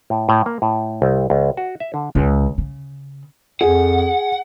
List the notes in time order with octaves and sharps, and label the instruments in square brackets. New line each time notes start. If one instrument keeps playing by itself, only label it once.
[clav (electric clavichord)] A2
A2
A#3
A2
C2
C#2
F#4
E5
D3
[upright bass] C#2
C#3
[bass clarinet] F2 [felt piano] G#4 [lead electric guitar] F#5